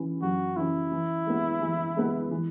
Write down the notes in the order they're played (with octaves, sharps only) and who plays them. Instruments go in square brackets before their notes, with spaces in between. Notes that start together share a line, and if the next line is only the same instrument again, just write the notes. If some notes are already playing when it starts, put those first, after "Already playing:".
Already playing: [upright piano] E3 C#4
[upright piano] F#2 [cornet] F#4
[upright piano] E3 C#4 [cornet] E4
[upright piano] E3
G#3 B3
E3
G#3 B3
E3